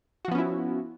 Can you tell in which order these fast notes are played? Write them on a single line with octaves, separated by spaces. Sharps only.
F#4 F3 B3 C#4 E4